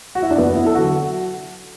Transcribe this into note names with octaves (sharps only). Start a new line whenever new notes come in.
F#4
E4
D4
F#1 B3
E4
A4
D3 F#3 F#4